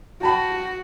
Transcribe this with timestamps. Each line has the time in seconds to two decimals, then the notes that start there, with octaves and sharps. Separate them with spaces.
0.21 F#4 G5 A5 B5